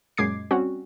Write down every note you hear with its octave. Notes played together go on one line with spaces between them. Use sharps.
F#2 A#2 G#3 D6 G#6 C7
G3 C4 C#4 F#4